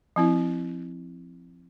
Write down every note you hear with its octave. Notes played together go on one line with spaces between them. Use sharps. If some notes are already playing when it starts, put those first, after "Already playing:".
F3 C4 E4